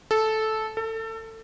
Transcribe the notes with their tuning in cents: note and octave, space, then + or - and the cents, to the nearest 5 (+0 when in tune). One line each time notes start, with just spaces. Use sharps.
A4 -10
A4 +25